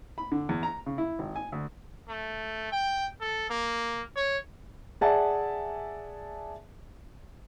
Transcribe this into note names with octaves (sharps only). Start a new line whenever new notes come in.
B5
D3
E2
A#5
C#3
E4
G#1
G#5
D2
A3
G5
A4
A#3
C#5
G#4 D5 E5 F#5 G#5 A5